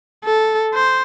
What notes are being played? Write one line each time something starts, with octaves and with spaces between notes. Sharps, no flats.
A4
C5